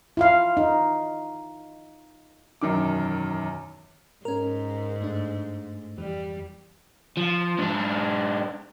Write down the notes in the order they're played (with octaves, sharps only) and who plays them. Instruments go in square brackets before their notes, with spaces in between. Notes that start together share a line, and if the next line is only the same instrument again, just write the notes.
[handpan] E4 F4 F5
D#4
[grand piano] E1 F#2 D#3 D6
[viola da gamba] G#2 [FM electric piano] C#4 A#4
[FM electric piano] G2 A3 D4
[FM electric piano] F2 E3 [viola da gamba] G3
[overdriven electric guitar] F3
G#2 D4